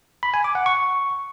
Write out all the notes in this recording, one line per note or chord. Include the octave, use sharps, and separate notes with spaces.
B5
G#5
D6
F#5
C#6